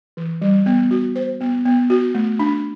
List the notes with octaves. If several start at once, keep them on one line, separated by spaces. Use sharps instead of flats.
E3
G3
B3
F#4
C5
B3
B3
F#4
A3
D4